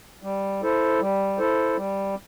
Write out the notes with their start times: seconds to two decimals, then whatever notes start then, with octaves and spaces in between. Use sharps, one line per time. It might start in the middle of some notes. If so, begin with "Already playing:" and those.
0.23 G3
0.62 E4 A4 C5
1.00 G3
1.38 E4 A4 C5
1.77 G3